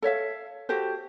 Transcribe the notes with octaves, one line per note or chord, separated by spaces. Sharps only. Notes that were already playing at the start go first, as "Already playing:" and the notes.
A4 C#5 E5 F5
F#4 G4 A4 C5